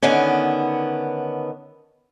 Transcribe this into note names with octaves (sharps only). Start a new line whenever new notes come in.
D3 D#3 B3 C#4